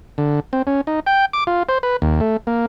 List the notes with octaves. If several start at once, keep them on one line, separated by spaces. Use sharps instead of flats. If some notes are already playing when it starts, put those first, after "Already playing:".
D3
C4
C#4
D#4
G5
D6
F4
C5
B4
D#2
A3
A#3